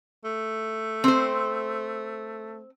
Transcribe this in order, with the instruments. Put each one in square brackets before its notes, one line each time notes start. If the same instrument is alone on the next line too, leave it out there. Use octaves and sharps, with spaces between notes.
[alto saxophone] A3
[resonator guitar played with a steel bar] C4 C5